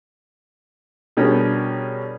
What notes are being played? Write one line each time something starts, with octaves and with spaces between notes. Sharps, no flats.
B2 G3 C#4 D4 G#4 A#4